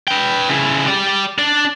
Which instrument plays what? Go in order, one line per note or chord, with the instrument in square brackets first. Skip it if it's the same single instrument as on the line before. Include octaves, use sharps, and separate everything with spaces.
[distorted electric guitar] B4 G5
C#3 E4
G4 D5
D4 D5